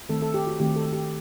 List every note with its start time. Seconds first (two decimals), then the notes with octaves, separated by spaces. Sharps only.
0.09 D#3 A3 C4 A4
0.22 A4
0.34 G4
0.47 F#4
0.60 D#3 A3 C4 G4
0.76 A4
0.93 G4